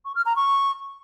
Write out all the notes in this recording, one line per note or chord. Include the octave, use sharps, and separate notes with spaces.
C#6
F6
A#5
C#6